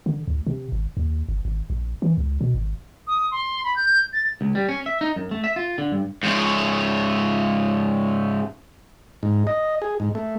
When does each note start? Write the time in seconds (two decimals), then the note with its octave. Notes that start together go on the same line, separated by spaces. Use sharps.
0.06 D3
0.28 D2
0.47 C3
0.72 G#1
0.97 D#2
1.29 G1
1.45 G#1
1.70 A#1
2.02 E3
2.17 C#2
2.41 B2
2.55 G#1
3.07 D#6
3.31 C6
3.64 B5
3.76 G6
4.13 A6
4.41 C#2
4.55 G3
4.69 C#4
4.86 E5
5.01 D#4
5.16 F#2
5.31 A3
5.44 E5
5.56 F4
5.78 D3
5.92 G2
6.23 G#2 C#3
9.23 G#2
9.47 D#5
9.82 G#4
10.00 G#2
10.15 A3